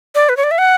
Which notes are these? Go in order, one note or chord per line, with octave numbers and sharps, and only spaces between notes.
D5
B4
C#5
D5
E5
F#5